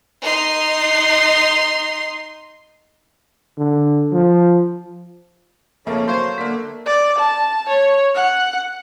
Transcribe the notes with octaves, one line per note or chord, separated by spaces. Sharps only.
D#4 C6
D3
F3
F2 C#3 A3 A#3 A5
F#3 C5 C#5 F5 G#6
D3 A#3 B6
D5
A5
C#5
F#5